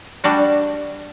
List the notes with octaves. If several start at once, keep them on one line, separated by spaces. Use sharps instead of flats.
G3 D4 F#4